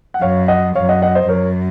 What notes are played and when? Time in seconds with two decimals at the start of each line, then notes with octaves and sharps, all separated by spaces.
0.14 F#5
0.21 F#2 C#5 F5
0.48 D#5 F#5
0.75 F#2 C#5 F5
0.89 D#5 F#5
1.02 D#5 F#5
1.15 C5 D#5
1.29 F#2 A#4 C#5